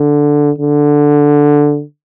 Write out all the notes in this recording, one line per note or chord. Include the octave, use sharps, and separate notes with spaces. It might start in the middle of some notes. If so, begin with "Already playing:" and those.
Already playing: D3
D3